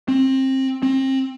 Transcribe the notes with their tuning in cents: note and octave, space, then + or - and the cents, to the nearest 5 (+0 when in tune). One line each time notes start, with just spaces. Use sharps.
C4 +25
C4 +30